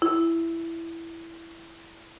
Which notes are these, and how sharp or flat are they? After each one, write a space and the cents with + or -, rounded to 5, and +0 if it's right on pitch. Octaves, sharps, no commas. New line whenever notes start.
E4 +10